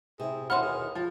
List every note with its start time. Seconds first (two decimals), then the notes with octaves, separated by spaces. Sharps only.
0.20 C3 E4 G#4
0.50 D#2 B2 E3 F#5 B5 C6 F6
0.62 G#4
0.95 F3